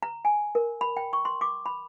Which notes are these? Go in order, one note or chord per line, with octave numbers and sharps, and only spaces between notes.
A#5
G#5
A#4
B5
G5
C#6
C6
D6
B5